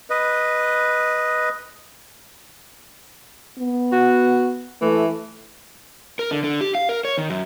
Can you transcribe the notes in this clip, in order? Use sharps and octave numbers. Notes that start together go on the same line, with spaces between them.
B4 D#5
B3
F#4
E3 A3
A#4
D3
D3
G4
F5
A#4
C#5
D#3
F#2